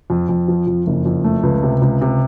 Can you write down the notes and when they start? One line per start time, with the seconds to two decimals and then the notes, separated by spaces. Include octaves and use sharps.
0.10 F2
0.29 F2
0.48 F3
0.67 F2
0.87 F#1
1.05 F2
1.24 A3
1.43 C#2
1.63 C3
1.82 C#2
2.01 C3